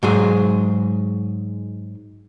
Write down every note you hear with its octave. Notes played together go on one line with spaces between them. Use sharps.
G#2 F#3 G#4